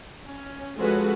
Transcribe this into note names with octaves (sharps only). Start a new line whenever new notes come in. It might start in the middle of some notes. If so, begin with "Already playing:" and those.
C#4
F3 G#3 C#4 F#4 A4 B4